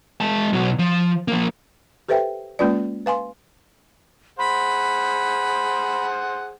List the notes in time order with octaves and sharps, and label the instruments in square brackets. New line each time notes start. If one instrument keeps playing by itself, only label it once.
[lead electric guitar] G#3 A5
B2 F#3
F3
F3 A#3
[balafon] G4 A4 B4 C5 E5 G5
G#3 A#3 C#4 F4 B4 D5
B4 F5 G#5 C6
[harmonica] G#4 C5 F#5 [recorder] B5